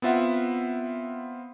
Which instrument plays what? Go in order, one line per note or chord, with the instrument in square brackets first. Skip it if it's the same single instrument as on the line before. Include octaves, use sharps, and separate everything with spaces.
[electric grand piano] B3 C4 F4 E5 F#5